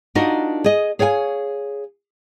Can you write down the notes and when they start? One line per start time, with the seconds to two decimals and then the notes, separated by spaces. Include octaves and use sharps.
0.15 D4 D#4 F4 F#4 A#4 D#5
0.64 G#4 D#5
0.99 G#4 C#5 F5 F#5 G#5